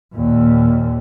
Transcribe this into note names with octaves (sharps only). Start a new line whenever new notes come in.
D#2 A#2